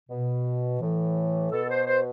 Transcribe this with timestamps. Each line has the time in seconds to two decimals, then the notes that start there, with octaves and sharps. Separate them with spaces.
0.10 B2
0.80 A2 E3
1.51 B2 A4
1.69 C5
1.87 C5